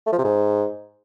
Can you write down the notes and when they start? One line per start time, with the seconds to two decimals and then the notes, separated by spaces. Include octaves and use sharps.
0.06 A3
0.12 F3
0.18 C3
0.24 G#2